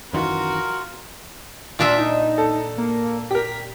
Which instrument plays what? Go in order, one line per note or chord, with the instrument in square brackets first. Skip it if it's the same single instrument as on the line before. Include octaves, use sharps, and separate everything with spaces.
[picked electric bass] F#2 D#3 E3 [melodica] F4 [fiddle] F#4 [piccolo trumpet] A#4
[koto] A#2 D4 E5 [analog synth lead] F4
[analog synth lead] D#4
[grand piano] A4
[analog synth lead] A#3
[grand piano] G4 A#4 [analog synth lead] B6